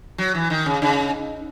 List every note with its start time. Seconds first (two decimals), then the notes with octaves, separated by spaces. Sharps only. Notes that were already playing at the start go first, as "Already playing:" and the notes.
0.18 F#3
0.35 E3
0.50 D#3
0.66 C#3
0.82 C#3 D#4